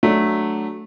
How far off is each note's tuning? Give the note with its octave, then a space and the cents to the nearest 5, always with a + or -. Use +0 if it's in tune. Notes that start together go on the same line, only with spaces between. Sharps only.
F#3 +0 A3 -10 D4 +0